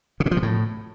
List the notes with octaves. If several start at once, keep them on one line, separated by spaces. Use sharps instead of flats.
C#3
A#2
F3
C3
A2